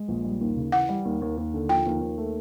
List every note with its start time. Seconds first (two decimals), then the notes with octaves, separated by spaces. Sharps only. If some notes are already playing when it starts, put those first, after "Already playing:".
Already playing: G#3
0.08 A#1
0.25 G3
0.41 D#2
0.57 C#3
0.72 E3 F#5
0.89 G3
1.05 D#2
1.22 D#2
1.37 D#2
1.54 D3
1.69 F3 G5
1.86 D#2
2.01 D#2
2.18 A3